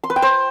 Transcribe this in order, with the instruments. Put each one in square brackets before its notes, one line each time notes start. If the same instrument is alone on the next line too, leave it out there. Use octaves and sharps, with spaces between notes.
[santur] C6
B4
G5
C5